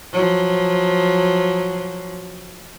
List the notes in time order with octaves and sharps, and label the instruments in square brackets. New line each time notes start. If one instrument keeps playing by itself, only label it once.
[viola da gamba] F3 F#3